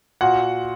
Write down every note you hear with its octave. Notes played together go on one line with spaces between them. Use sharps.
A#2 F#4 F#5